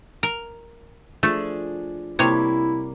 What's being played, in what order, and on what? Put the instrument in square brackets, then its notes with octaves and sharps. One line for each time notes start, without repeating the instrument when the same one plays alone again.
[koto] A#4
[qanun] F3 D4 G#4 [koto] A3
[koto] C3 C#5 [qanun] G3 A#3 [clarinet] E4